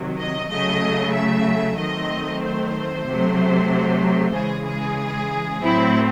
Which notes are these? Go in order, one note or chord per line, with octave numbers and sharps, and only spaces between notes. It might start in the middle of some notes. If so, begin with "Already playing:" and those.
Already playing: C3 D#3 F#3
D#5
C#3 F#3 A3 D#5
E5
D#3 F#3 A3 C4 D#5
C5
C3 F#3 A3
C#3 E3 G#3 G#4
G#4
A2 F#3 C4 E4